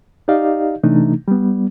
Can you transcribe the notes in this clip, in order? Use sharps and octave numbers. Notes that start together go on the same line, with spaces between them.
D#4 G4 D5 D#5 F5
C3 E3 A3 D4 D#4
G3 B3